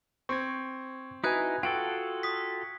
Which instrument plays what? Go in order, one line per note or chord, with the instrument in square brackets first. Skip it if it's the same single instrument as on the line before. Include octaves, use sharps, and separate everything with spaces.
[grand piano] C4 [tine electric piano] C#6 G#6
[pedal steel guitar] D#4 E4 [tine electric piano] F#4 B4 G#5 [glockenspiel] D#6 F#6 G#6
[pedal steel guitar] F4 F#4 A4 [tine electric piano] G5 [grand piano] D7
[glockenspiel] D#6 B6